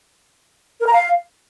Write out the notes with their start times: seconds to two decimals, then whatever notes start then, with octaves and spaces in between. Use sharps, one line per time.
0.81 A#4
0.87 A#5
0.93 F5